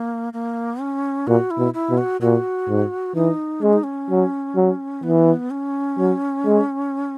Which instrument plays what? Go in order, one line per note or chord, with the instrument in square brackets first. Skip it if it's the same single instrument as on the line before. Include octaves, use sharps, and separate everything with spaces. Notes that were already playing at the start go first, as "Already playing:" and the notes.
Already playing: [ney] A#3
A#3
C#4
[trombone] A#2 [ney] F#4
[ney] E4
[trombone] B2
[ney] E4
[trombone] B2
[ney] F#4
[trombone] A#2 [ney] F#4
[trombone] G#2
[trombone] E3 [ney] D#4
[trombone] G#3 [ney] C#4
[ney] D#4
C#4
[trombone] F#3
F#3
[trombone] E3 [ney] B3
[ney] C#4
[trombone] F#3
G#3